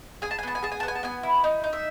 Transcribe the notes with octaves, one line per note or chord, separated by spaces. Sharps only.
G#4 G#5
A5
G#5
B3 A5
G#5
G#4 A5
G#5
A5
B3
G#5
A5
B3 G#5
E4
D#4
D#4
E5